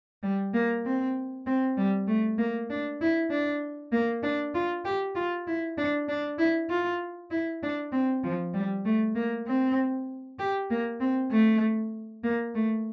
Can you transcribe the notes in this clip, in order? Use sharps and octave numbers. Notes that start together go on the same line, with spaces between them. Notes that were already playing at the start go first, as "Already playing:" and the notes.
G3
A#3
C4
C4
G3
A3
A#3
D4
E4
D4
A#3
D4
F4
G4
F4
E4
D4
D4
E4
F4
E4
D4
C4
F3
G3
A3
A#3
C4
G4
A#3
C4
A3
A#3
A3